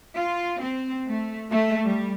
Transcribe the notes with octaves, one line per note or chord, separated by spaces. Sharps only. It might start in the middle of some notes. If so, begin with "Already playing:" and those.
F4
C4
A3
A3
G3